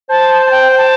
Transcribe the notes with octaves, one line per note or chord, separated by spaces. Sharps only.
C5 A5
A5
G5
G5
A5